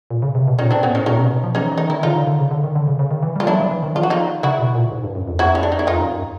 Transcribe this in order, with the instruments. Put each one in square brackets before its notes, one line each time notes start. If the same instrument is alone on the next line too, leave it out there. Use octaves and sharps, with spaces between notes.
[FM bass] A#2
C#3
C3
B2
[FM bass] A#2 [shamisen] C#4 D#4
[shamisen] C4 D4
[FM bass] A2 [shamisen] B3 C#4
[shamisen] C#4 D#4
[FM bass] A#2 [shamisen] C#4 D#4
[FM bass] B2
B2
F3
[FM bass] E3 [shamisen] C#4 D#4
[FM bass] E3
[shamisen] D#4
[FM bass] D#3 [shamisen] E4
[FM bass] D3 [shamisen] D#4 F4
[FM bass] D3
D3
C#3
D3
D#3
D3
C#3
C#3
D#3
E3
[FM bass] G3 [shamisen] F4
[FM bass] F#3 [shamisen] D4 E4
[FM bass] F3
E3
D#3
[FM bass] F3 [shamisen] F4
[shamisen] F#4
D#4 F4
[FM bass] C#3 [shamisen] E4 F#4
[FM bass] B2
A#2
G#2
G2
F#2
F2
[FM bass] F2 [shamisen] E4 F#4
[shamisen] C#4
D4
D#4
E4
[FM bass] F2 [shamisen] D#4 F4
[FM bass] F#2
F#2